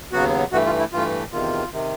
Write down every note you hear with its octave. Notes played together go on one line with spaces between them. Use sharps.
D#2 C#3 F#3 B3 F#4
G2 E3 A3 F#4
F4
E4
G2 E3 A3 F4
E2 C3 D#3 F4
C3 D#3